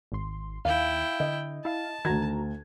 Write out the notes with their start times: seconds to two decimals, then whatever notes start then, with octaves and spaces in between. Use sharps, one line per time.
0.12 G#1 C6
0.65 D#2 E4 F5 G5
1.20 D3 D#5
1.65 E4 F5 A5
2.05 D2 D#3 F#4 A#5 G#6